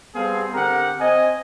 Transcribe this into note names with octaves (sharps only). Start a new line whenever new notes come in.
G3 B3 C4 G#4 A4 F5
D3 C4 G4 A#4 F#5 A#5
C4 D#5 G#5